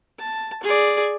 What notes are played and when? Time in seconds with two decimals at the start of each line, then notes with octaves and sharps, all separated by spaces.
0.18 A5
0.63 G#4 D5